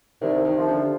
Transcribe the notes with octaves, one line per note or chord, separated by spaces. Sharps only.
C2 D#3
D#3
C3 F3
D3